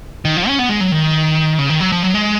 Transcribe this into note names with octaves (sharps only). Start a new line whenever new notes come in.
D#3
F3
C#4
B3
G#3
F#3
D#3
C#3
D#3
F#3
F3
F#3
G#3